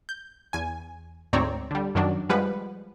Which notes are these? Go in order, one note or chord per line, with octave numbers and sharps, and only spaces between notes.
G6
E2 G#5
D2 G#2 C4 C#5 D5 A#5
D3 G3
F#2 D#3 F#3 D4
F3 G3 G#3 B4 F#5